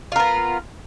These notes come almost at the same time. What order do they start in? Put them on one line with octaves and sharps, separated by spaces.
F4 A#4 B3